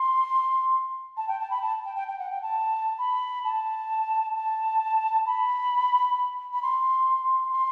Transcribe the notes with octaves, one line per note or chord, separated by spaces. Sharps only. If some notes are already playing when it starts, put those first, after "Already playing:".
Already playing: C6
A5
G5
A5
B5
A5
G5
G5
G5
F#5
G5
A5
B5
A5
A5
B5
B5
C6
C6